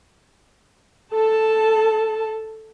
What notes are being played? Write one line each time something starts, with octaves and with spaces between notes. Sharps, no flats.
A4 A5